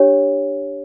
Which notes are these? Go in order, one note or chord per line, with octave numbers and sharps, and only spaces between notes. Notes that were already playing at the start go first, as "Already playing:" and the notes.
Already playing: D4 G4 C#5